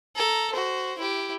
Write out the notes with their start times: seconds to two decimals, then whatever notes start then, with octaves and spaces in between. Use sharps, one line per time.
0.16 A4 A#5
0.53 F#4 C5
0.98 E4 G4